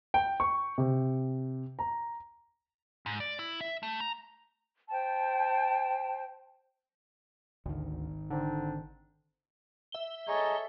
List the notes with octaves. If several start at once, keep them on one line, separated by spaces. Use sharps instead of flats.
G5
C#6
C3
A#5
G#2
D5
E4
E5
A3
A#5
C5 G5 A5
G#1 D2 D#3
D3 C4 D4 D#4
E5 G7
G#4 A4 C#5 D#5 A#5